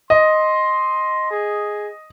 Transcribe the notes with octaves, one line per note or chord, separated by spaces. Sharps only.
D#5 C6
G#4